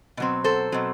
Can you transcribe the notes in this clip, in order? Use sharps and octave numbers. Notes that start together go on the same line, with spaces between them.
B2 F#3 C4
A4 C5
B2 F#3 C4